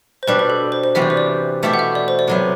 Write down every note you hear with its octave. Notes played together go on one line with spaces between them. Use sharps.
C5
B2 G3 D4 B4
B4
A4
C5
C5
C3 E3 G3 B3 F#4 E5
D5
C5
D5
B2 A3 E4 G4
F#5
E5
D5
C5
D5
C3 F#3 B3